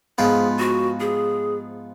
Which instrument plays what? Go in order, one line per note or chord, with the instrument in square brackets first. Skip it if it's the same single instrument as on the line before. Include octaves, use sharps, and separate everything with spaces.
[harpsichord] G#2 F3 B3 F4 [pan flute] G#4
[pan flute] F#4
G#4